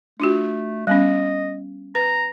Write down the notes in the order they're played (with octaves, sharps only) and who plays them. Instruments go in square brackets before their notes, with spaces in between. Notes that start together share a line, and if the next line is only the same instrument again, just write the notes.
[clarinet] A3 [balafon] D4 F4 F#4
[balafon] G3 B3 C#4 [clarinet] D#5
[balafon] B4 [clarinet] A#5